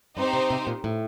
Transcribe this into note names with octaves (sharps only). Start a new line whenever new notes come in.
G2 C4 D#4 G4 C5
C3
C3
A#2
A2